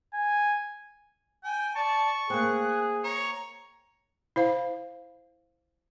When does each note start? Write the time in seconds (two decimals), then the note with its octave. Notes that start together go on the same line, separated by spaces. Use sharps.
0.14 G#5
1.44 G5 G#5
1.76 D5 A5 C#6
2.30 A#3 C4 G#4 F#6
3.04 C#5 A#5
4.36 E4 C5 F5